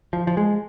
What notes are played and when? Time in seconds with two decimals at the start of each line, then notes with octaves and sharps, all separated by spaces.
0.13 F3
0.27 F3
0.37 G#3